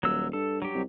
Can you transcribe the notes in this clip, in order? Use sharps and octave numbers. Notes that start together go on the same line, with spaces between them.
D#1 F#3 E6
G2 A4
F#3 G4
C2